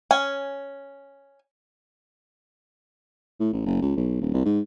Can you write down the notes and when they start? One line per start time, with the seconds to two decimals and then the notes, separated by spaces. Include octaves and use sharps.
0.11 C#4 G#5
3.40 A2
3.53 A1
3.66 F#1
3.82 C#2
3.96 B1
4.21 D#1
4.33 C2
4.46 G#2